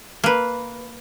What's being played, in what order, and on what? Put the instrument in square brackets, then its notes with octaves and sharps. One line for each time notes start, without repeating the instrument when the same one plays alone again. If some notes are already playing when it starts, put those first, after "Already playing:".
[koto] A#3 B4